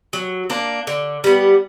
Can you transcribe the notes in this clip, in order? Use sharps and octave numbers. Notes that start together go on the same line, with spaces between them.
F#3
A#3 D4
D3
G3 B3